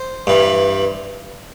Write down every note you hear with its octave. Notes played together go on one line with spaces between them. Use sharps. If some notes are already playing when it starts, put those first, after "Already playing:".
Already playing: C5
G2 E3